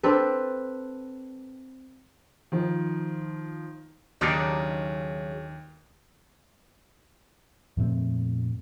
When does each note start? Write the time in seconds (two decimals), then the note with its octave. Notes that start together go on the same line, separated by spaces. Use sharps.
0.03 C4 D4 A4 B4
2.52 D#3 F3
4.21 D#2 C#3 F#3 D4 D#4 D5 F6
7.77 F2 A#2 A3 C4